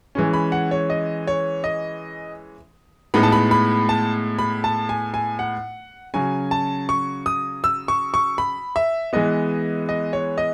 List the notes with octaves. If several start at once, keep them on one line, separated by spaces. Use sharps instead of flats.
E3 G#3 C#4
B5
F#5
C#5
D#5
C#5
D#5
A2 G#3 B3 D#4 B5
A5
B5
B5
A5
B5
A5
G#5
G#5
F#5
C#3 F#3 C#4 G#5
A5
C#6
D#6
E6
C#6
C#6
B5
E5
E3 G#3 B3 D#5
D#5
C#5
D#5